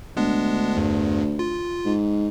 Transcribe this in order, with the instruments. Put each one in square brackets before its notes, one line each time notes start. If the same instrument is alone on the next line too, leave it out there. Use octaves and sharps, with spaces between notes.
[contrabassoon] D2 [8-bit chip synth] G#3 B3 D4
[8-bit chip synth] E2 G2
F4
[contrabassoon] G#2